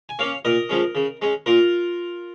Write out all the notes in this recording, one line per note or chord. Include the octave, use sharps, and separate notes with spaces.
G#5
A#3 C#4 C#5 F5
A#2 A#4 D#5
F3 G#3 C#4
C#3
G#3 C#4
A#2 F4 A#4